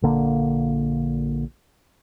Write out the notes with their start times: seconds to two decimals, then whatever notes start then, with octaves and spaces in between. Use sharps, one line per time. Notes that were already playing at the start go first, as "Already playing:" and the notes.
0.02 A#1 D3 A#3